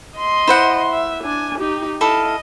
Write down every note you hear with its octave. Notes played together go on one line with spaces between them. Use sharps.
D#5 C6
E4 C5 F#5
E5
D4 G#5
D#4 G4
E4 A4 D#5 F5